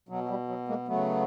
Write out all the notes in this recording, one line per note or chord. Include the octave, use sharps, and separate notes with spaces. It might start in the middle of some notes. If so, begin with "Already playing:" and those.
B2 F#3
F#3
G3
F#3
G#3 A#3
C#3 F#3 A3 B3